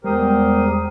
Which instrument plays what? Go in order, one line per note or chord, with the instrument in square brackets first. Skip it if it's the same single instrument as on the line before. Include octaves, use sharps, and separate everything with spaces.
[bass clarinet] E2 [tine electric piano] G3 G#3 [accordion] G4 A#4 [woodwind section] C5 D#6